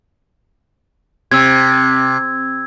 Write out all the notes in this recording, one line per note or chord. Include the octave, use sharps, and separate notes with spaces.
C3 E6 G#6